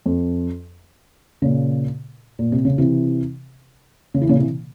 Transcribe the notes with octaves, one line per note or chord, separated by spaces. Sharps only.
F2
A#2 C#3
A#2
C3
C#3
C3 E3
C#3
E3
A#2 C#3
C3 E3